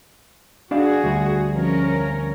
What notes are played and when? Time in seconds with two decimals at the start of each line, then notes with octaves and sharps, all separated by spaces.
0.71 D4 F#4 G#4 D5 F5
1.04 D2 G3
1.52 F3 C#4 A#4